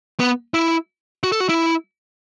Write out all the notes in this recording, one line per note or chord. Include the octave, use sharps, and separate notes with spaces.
B3
E4
F#4
A4
F#4
E4